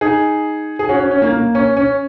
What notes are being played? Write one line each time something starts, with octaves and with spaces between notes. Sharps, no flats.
D#4 G#4
G#4
C#4 F#4
C#4
C#4
A#3
A#3
C#4
C#4